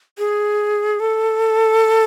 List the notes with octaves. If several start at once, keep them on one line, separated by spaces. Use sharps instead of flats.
G#4
A4